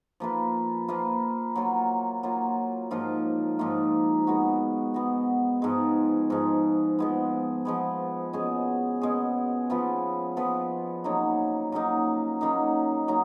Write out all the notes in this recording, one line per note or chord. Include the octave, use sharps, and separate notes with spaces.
F3 A#3 F4 B4
F3 A#3 F4 B4
F#3 A#3 F4
F#3 A#3 F4
G#2 F3 A#3 F4
G#2 F3 A#3 F4
G#3 B3 F#4
G#3 B3 F#4
G#2 F3 G#3
G#2 F3 G#3
F3 G#3 B3
F3 G#3 B3
B2 G#3 C#4 G#4
B2 G#3 C#4 G#4
F3 B3 F4 B4
F3 B3 F4 B4
C#3 F#3 A#3 D#4
C#3 F#3 A#3 D#4
C#3 F#3 A#3 D#4
C#3 F#3 A#3 D#4